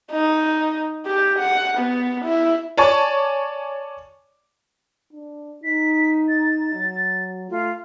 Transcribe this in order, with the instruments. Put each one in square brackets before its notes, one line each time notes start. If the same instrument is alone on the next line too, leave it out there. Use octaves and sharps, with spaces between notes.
[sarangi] D#4
G4
F#5
B3
E4
[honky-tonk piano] C#5 D5 G#5 A5 C#6
[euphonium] D4
[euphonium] D#4 [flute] B6
[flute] A6
[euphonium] F#3
[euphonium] A3 [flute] F4